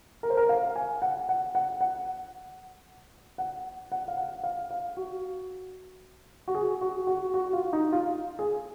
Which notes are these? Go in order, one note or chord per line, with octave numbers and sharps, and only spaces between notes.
A#4
C5
A#4
F5
G#5
F#5
F#5
F#5
F#5
F#5
F#5
F5
F#5
F5
F5
F#4
F#4
G#4
F#4
F#4
F#4
F4
D#4
F4
G#4